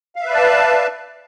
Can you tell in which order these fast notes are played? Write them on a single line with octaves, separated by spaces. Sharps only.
F5 E5 B4 D5 A5